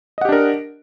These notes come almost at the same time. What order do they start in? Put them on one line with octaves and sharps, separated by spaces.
D#5 F#5 G4 D4 A#4